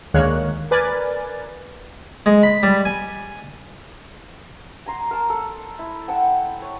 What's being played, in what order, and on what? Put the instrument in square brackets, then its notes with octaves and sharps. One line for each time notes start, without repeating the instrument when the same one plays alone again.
[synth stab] D2 D#3 G#3 A#3 C#5 F#6
A#4 B4 D5 G#5 A6
[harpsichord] G#3
B5
G3
G#5
[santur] G#5 A#5 C6
A#4 A5
A4
E4
F#5 G5 A5 E6
C#5